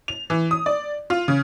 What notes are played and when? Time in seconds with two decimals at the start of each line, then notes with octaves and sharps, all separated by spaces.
0.08 F7
0.30 E3
0.51 D#6
0.66 D5
1.10 F4
1.28 C#3